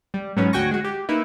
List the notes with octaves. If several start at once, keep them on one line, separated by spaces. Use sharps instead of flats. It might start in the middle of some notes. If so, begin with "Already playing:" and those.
G3
G#2 F#3 B3 C#4
D2 F#4 G5 G#5 C#6 A#6
G#3 F#4
G4
A#3 D#4 E4 B4